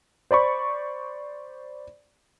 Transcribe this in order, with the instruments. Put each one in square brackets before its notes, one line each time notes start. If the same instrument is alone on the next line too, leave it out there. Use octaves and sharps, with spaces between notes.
[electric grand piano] C5 D5 B5 C#6